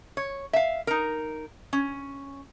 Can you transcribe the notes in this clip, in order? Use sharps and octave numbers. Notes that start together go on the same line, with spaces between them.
C#5
E5 F5
D#4 A#4
C#4